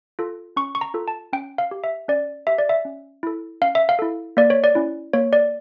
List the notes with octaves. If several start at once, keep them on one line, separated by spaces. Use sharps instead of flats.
F4 A4
C#4 C#6
C#6
A#5
F4 A4
A5
C#4 G5
F5
G4
E5
C#4 D5
G4 E5
D5
E5
C#4
E4 A4
C#4 F5
E5
F5
E4 A4
A#3 D5
C#5
D5
C#4 E4
A#3 C#5
D5